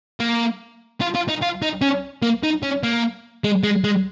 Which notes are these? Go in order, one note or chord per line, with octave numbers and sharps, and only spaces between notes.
A#3
F4
F4
D#4
F4
D#4
C#4
A#3
D#4
C#4
A#3
G#3
G#3
G#3